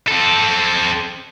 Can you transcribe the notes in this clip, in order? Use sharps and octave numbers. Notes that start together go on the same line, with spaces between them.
C4 A4